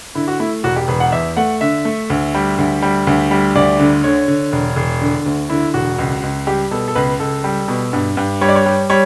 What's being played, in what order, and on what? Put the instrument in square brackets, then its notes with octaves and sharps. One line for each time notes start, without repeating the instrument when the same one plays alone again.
[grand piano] D3 E4
F#4
A3 E4
E1 F#4
G4
E1 B4
F#5
E2 E5
A3 F#5
D3 E5
A3
D2
G3
D2
G3
D2
G3
D2 D5
D3
D3 C#5
D3
E1
E1
D3
D2
D3 E4
E1 F#4
C#2
C#2
G3 G4
B2 A4
A4
C#2 B4
C#2 A4
G3
B2
G2
G2
G3 C#5
D5
C#5
G3
G3 C#5